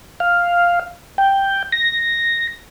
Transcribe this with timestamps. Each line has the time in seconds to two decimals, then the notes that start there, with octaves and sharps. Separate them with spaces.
0.20 F5
1.18 G5
1.72 A#6